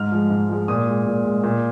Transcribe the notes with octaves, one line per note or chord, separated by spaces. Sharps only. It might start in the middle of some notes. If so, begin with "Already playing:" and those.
Already playing: G#2 F6
F3 G#3
G#2
F3 G#3
A#2 D#6
G#3
A#2
G#3
A#2